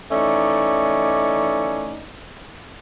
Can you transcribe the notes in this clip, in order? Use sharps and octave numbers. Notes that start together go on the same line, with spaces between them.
E3 A3 C#4 D#4 D5